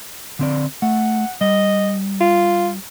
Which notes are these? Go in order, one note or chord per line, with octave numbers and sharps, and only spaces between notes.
D3 C4 D5
A3 F#5
G3 D#5
F4